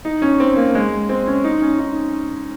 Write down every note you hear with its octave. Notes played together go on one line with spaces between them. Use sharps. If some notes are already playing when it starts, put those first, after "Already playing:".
D#4
C#4
C4
A#3
G#3
C4
C#4
D#4
C#4
D#4